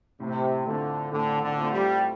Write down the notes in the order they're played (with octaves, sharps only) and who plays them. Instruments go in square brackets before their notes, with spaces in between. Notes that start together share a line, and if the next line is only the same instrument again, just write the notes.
[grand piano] A2 [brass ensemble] C3
[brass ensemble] D3 [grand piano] A3 C4 F4
[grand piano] A2 [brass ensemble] D3
[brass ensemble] D3
[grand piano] A3 C4 F4
[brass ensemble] G3